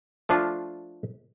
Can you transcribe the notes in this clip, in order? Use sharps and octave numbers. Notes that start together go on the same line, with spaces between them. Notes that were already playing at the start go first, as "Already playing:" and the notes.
F3 A3 D4 F4